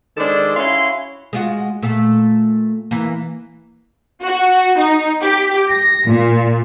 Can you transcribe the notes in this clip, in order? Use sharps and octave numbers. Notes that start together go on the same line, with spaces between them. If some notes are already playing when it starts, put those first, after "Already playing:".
D#3 G#3 D4 A4 C5 D5
C#4 E4 F#4 F5 C6
G#3 F4 F#4
A#2 A3
E3 A#3
F#4
D#4
G4
A#6
A#2